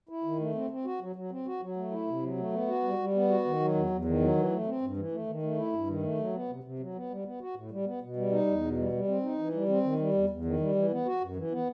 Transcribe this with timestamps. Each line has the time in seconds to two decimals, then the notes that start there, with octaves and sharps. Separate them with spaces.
0.09 E4
0.24 D#3
0.40 A3
0.55 C4
0.70 C4
0.85 F#4
1.01 F#3
1.16 F#3
1.31 C4
1.46 F#4
1.61 F#3
1.76 A3
1.92 E4
2.07 C3
2.22 F#3
2.37 A3
2.53 B3
2.68 F#4
2.84 G3
2.99 G3
3.14 B3
3.29 F#4
3.45 D#3
3.60 F#3
3.74 E2
3.90 E2
4.05 D#3
4.20 F#3
4.35 E3
4.51 A3
4.66 C4
4.82 G2
4.97 E3
5.12 A3
5.27 D#3
5.43 A3
5.58 E4
5.73 G2
5.87 D#3
6.03 A3
6.18 F#3
6.33 B3
6.49 C3
6.64 C3
6.79 F#3
6.95 B3
7.10 G3
7.25 B3
7.41 F#4
7.56 A2
7.71 G3
7.85 B3
8.01 B2
8.16 G3
8.31 D#4
8.46 E2
8.62 B2
8.77 G3
8.92 G3
9.08 C4
9.23 D#4
9.38 E3
9.54 G3
9.69 C4
9.84 D#3
9.99 G3
10.14 E2
10.29 E2
10.45 D#3
10.60 G3
10.75 E3
10.90 B3
11.06 F#4
11.21 F#2
11.36 E3
11.51 B3